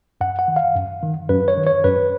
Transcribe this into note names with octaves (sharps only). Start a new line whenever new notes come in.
F#2 F#5
F#5
D#3
F5
F#2
D#3
F#2 B4
C#5
D#3
C#5
F#2 B4